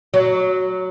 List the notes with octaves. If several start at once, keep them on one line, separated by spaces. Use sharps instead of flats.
F#3